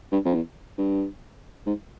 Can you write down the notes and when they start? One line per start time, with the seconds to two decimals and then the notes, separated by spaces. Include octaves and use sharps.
0.12 G2
0.25 F2
0.34 E2
0.78 G2
1.66 G#2